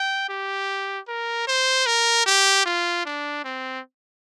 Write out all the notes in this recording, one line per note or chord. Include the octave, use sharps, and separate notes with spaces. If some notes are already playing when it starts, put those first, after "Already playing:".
Already playing: G5
G4
A#4
C5
A#4
G4
F4
D4
C4